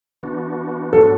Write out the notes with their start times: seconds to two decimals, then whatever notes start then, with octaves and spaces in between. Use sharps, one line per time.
0.23 E3 B3 D4 F#4
0.93 G#2 F#3 B3 D4 F#4 A4